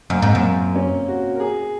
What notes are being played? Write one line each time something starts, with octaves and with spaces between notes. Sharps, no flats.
F#2 A#3
G#2 C4
F#2 A#3
C#4
F#4
A#4
G#4